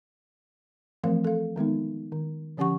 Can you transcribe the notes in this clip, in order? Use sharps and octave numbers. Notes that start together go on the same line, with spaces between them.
E3 F3 A3 C4 A#4 F5
A4 F5
D#3 G#3 B3 D#4
D#3
D3 F3 C#4 G4 F#5 C#6